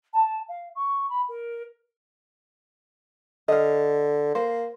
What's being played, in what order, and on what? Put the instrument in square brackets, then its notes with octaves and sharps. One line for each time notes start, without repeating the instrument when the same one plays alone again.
[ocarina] A5
F5
C#6
B5
A#4
[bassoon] D3 [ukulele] D#5 F5
[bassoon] A#3 [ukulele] C5